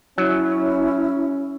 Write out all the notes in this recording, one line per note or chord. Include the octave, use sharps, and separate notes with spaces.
F#3 C#4 E4